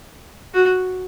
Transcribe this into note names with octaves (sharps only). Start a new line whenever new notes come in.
F#4